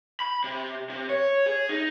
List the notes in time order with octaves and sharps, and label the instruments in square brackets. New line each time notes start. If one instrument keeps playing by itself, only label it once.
[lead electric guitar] B5
C3
C3
C#5
G#4
D#4